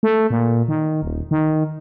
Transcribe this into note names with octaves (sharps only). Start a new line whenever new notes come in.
A3
A#2
D#3
D#1
D#3